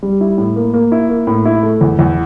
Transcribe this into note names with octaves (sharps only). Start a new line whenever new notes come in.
G3
E4
A2
A#3
A#3
E4
A#3
A2
E4
A3
E2
E2